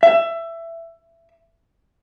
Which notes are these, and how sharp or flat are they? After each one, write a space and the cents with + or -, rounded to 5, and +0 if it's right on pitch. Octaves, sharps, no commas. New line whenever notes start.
E5 +20